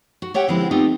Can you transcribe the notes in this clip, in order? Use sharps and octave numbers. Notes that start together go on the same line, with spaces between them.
F#4
G4 C#5 E5 F#5 G5
D3 F3 G#3 B3 C4 E4
A3 B3 C4 D#4 F4 G4